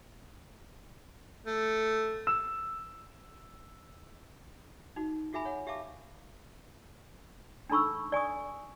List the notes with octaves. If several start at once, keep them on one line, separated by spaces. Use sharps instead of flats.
A3
E6 E7
D#4 F#4
F4 F#4 G#4 E5 G#5 B5
C#5 F#5
G4 E5 F5 A5 D6
D4 D#4 A4 B5 C#6 E6
D5 G#5 C#6 D#6